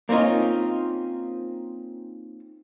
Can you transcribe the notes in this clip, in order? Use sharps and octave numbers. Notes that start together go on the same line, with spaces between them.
A#3 C4 C#4 D#4 F4